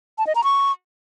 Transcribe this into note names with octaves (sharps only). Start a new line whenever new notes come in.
A5
D#5
A#5
C#6